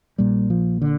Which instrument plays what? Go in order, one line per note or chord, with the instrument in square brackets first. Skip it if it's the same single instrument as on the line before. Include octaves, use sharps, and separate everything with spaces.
[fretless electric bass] A#1 A#2 G3
F3
D3